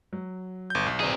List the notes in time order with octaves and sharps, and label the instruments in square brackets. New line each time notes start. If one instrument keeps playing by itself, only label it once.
[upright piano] F#3
[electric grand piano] G1 G6
B1
[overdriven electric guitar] C4 G#4 [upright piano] B4 D5 A#5